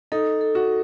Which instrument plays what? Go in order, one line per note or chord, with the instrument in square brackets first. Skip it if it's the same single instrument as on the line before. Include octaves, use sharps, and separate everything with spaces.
[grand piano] D#4 [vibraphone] A4
[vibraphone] A4
[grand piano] F#4